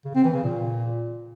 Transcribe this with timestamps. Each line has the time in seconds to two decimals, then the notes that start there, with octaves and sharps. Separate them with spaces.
0.05 C#3
0.15 C4
0.24 E3
0.34 C#3
0.43 A#2